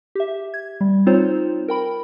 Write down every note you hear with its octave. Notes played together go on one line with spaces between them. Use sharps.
G4 E5
G#6
G3
C4 D#4 F4 C5 C#5
A#4 G5 B5